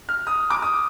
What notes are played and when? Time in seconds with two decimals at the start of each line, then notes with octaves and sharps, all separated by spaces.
0.09 F6
0.27 D#6
0.50 D6
0.62 D#6